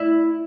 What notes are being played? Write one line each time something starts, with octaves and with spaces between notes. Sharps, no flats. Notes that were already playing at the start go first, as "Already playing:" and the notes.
Already playing: E4